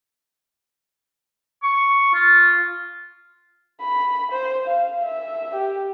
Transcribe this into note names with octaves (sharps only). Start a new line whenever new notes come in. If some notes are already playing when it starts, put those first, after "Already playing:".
C#6
F4
B5
C5
F5
E5
G4